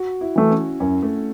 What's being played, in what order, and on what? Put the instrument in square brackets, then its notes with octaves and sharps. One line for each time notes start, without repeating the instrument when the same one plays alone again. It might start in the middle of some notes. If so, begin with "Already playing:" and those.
Already playing: [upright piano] F#4
E4
[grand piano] E3 A3
[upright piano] C#4
[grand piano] F#2 [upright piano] C#4
[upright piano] A3